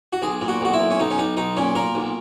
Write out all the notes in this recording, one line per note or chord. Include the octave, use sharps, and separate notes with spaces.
F#4
B1 G#4
A#2
F#4
B1 F#4
E4
B1
C#4
B1 D#4
C#4
B1 D#4
B1 D#4
A#2 C#4
A#2 A#4
B1